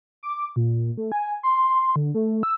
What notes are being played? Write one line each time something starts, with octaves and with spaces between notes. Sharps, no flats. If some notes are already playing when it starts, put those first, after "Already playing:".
D6
A#2
A3
G#5
C6
D3
A3
E6